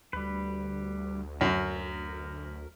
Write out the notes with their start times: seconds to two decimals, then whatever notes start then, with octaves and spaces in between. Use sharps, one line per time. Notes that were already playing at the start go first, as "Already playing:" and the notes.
0.13 D2 G3 B4
1.41 F#2 A#4